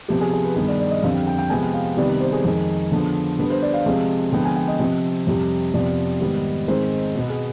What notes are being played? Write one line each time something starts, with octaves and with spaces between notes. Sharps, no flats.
C3 F3 B3 G4
G#4
G#4
B4
G2 D#3 B3 G#4
D5
D5
D#5
F2 D3 G3 C4 F5
G5
G5
G5
C3 F3 G#3 B3 G#5
G5
F5
C3 D#3 G3 B3 D5
D5
C5
G#4
F2 D#3 G#3
D3 F3 B3
D3 G3 B3 B4
C5
D5
F5
C3 F3 G#3 C4
D3 F3 G#3 B3 G5
G#5
G5
D#5
C3 F3 C4
F2 C3 G3
F2 C3 F3 B3 D5
G#2 D#3 G3 B3
G#2 D#3 G#3 C4 C5
B2 B3
G#4